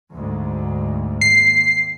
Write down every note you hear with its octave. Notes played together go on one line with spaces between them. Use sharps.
D2 G#2
D#2 C7